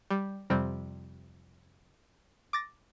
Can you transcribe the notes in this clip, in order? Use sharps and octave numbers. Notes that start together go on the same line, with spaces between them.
G3
F2 C3 G3 C4
D6 A6 A#6